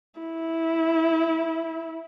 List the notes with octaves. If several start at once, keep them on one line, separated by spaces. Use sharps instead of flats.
E4